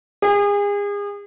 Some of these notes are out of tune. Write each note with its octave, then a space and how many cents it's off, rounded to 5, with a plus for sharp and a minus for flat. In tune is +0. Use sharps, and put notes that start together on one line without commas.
G#4 -35